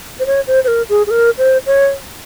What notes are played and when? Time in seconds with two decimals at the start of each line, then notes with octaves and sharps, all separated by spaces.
0.19 C5
0.26 C#5
0.47 C5
0.64 C5
0.68 A#4
0.89 G#4
1.07 G#4
1.11 A#4
1.38 C5
1.66 C#5